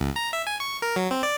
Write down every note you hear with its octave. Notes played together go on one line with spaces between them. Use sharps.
C#2
A#5
E5
G#5
C#6
A#4
F#3
C4
D5